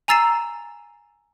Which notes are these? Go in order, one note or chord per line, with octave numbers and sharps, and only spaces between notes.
G#5 A#5 E6 A6 C7 E7